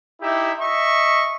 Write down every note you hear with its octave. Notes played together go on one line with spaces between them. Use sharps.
D#4 E4 G4 E5
D#5 E5 C#6